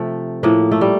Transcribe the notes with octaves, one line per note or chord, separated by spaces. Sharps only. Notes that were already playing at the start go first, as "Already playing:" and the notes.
Already playing: C3 F3 A3
A2 F3 A#3
A3
G3